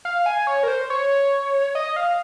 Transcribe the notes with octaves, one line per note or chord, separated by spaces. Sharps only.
F5
G#5
C#5
A#4
C5
C#5
D#5
F5